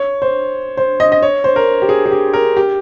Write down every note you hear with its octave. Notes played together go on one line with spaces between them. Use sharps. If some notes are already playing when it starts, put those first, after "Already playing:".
Already playing: C#5
C5
C5
D#5
D#5
C#5
C5
A#4
G4
G#4
G#4
G4
A#4
G4